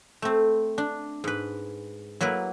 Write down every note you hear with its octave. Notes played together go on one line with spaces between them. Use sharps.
A3 C4
D4
G#2 B4
F#3 A#3 E4 B4